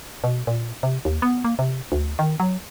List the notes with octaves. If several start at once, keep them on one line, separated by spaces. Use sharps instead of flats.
B2
A#2
C3
D#2
B3
A#3
C3
D2
D#3
F#3